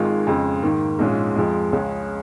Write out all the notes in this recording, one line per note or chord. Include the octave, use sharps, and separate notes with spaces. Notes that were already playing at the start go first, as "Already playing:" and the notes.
Already playing: G#1 G#2 D#3 G#3 F4
F2 C#3 G#3
G#2 D#3 A#3
A#1 G#2 G#3 C#4 F4
F2 F3 G#3
C#2 C#3 G#3 C#4